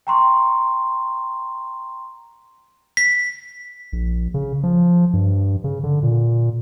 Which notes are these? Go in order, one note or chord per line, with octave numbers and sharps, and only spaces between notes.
G5 A#5 C6 C#6
B6
A#1
C#3
F3
G2
C#3
D3
A#2